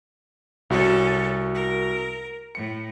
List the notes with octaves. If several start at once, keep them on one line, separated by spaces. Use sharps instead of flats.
C2 C#4 F#4 A4
A#4
A2 C#7